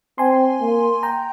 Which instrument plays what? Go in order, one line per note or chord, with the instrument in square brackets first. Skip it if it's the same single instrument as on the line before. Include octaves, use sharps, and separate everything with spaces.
[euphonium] C4 [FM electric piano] G#5 C6
[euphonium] A#3
[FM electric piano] G5 A#5